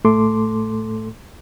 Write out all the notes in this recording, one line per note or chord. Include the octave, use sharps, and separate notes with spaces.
A2 A3 A4 C6 D6